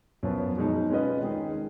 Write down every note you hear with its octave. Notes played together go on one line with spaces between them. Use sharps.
F#2 F3 B3
B2 G#3 D#4
G#3 C#4 F4 B4 D#5
D#3 G#3 D#4 G#4